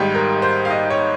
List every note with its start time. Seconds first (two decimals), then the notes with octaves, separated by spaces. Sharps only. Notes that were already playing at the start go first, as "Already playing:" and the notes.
Already playing: G#1 G#2 G3 G5
0.15 A#4
0.42 C5
0.65 F5
0.70 D#5
0.90 C#5